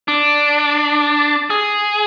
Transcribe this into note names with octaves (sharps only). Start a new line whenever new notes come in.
D4
G#4